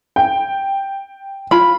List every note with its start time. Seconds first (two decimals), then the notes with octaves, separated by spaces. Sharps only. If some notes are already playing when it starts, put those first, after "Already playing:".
0.16 G5
1.51 F4 B5